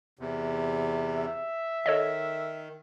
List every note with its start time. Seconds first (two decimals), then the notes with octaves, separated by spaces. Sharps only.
0.19 E2 C3
1.11 E5
1.86 D#3 A4 C#5 D#5